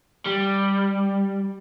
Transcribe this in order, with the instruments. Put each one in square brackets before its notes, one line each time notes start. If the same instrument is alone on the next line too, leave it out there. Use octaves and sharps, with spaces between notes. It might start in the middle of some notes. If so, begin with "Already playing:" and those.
[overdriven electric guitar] G3